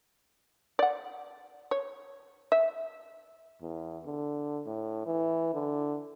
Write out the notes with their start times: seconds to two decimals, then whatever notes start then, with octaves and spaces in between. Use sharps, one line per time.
0.79 D5 F#5
1.71 C#5
2.52 E5
3.62 E2
4.06 D3
4.67 A2
5.06 E3
5.54 D3